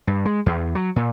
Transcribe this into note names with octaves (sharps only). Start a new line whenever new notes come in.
G2
G#3
E2
F#3
A#2